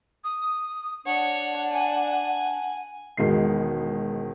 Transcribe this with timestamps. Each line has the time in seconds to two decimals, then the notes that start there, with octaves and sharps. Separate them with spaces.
0.24 D#6
1.06 D4 C#5 F#5 A5
1.72 G#5
3.17 E1 B2 D#3 G#3 C7